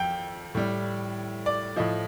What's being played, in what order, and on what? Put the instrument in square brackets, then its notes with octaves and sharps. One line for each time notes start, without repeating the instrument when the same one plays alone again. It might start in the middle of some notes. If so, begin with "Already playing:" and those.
Already playing: [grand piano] F2 G5
A2 G3
D5
A2 F3 D#5